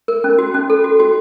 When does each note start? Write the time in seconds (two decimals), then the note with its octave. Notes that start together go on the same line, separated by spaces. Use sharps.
0.08 A#4
0.24 C#4
0.39 F#4
0.54 C#4
0.70 A4
0.84 F#4
1.00 F#4